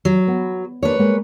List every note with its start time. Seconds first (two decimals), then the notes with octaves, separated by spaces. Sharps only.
0.05 F#3
0.28 B3
0.83 A#3 D4 G4 B4 C#5
0.99 G3 G#3 A#3